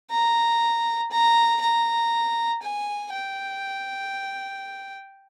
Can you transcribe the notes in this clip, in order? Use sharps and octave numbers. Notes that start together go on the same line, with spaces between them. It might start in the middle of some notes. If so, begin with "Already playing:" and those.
A#5
A#5
A#5
G#5
G5